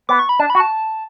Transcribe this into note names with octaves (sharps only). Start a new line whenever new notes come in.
B3 D6
C#6
B5
D4 A5
B5
F#4
A5